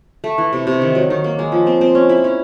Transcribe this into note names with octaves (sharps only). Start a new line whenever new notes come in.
A3
E3
C3
C3
D#3
F#3
D#3
A#3
G#3
F3
C4
C4
C#4
E4
C#4